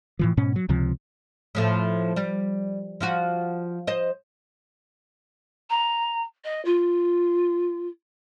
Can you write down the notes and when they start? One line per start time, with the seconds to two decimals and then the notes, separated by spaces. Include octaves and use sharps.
0.19 A2 E3 F3
0.37 G#2 B2 C#4
0.56 F#3
0.69 C#2 C3 F3
1.55 A2 F3 A3
2.16 G3
3.01 F3 F4 F#4
3.87 C5 D#5
5.69 A#5
6.44 D#5
6.64 F4